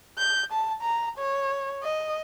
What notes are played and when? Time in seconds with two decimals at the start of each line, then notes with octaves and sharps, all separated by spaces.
0.18 G6
0.53 A5
0.82 A#5
1.18 C#5
1.83 D#5